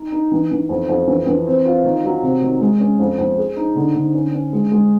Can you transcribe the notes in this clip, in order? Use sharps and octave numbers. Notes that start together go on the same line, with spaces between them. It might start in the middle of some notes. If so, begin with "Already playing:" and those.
Already playing: D#4
D#4
E3
E3
F2
F2
E3
E3
C4
F4
D#3
F#3
C3
D#3
G#3
C#4
F2
F2
G#4
D#4
D3
D3
C#4
C#4
G#3
G#3